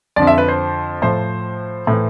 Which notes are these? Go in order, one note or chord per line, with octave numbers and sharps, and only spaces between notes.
F2 D3 F3 D5
E5
B4
C5
A2 F3 C5
A2 E3